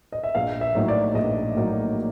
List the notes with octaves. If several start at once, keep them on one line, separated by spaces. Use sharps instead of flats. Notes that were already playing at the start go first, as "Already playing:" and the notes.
D#5
E5
A#1 F5
E5
A2 F#3 A#3 D#4
D5
A#1 D#5
A2 F#3 A#3 D#4